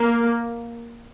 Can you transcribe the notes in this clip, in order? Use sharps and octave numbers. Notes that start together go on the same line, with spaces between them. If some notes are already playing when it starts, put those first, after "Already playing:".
Already playing: A#3